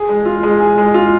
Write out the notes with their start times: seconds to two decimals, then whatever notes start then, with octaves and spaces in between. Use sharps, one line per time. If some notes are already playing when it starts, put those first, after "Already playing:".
Already playing: G#4
0.09 G#3
0.25 F4
0.43 G#3
0.60 G#4
0.78 G#3
0.94 F4